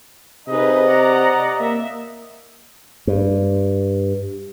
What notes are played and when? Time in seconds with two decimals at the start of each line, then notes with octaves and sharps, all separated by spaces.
0.48 C3 D#4 G#4 B4 D#5
0.87 D5 F#5 A#5
1.60 A#3 E5
3.07 G2